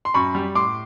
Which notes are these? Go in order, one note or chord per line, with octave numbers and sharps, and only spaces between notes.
C6
F#2 B5 C#6
G3
A2 C6 D6